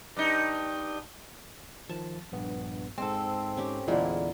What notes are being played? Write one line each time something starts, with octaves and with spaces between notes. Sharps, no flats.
G2 D#4
D#3 F3 A5
A#1 G2 B3
G#2 G#3 C4 A4
C#4 G4
E2 A#2 D3 G#3 A#3 E4